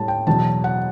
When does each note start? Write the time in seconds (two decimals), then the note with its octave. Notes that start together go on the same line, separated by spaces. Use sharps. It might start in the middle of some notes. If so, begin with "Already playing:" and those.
Already playing: A2 G3 A5
0.08 G5
0.27 E2 B2 F#3 A5
0.64 F#5